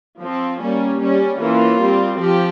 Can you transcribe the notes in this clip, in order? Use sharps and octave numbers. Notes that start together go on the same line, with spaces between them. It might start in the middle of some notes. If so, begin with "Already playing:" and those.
F3 C4
G3 A#3 C#4
G3 C#4
E3 A#3 C#4 F4
G3 C4
F3 G4